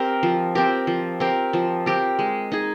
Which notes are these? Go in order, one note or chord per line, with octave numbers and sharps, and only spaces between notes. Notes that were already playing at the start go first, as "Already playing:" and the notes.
Already playing: C4 G4 A#4
F3
C4 G4 A#4
F3
C4 G4 A#4
F3
C4 G4 A#4
G#3
D#4 G#4